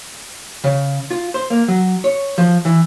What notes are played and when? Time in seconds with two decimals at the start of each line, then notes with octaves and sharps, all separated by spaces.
0.64 C#3
1.11 F4
1.34 C5
1.50 A#3
1.68 F#3
2.04 C#5
2.38 F3
2.65 E3